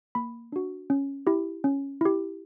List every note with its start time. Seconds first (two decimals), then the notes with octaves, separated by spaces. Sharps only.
0.15 A#3 B5
0.52 D4 F#4
0.90 C#4
1.27 E4 G4
1.64 C#4
2.01 E4 G4